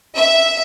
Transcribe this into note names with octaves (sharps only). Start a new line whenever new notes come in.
E5